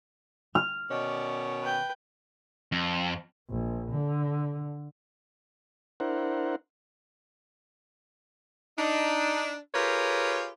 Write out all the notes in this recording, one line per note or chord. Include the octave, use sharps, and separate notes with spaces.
F6
B2 D#3 C#4 D5
B4 G5
F2
A#1
D3
D4 E4 A#4 C5 F#5
D4 D#4
F4 G4 G#4 A#4 B4 C#5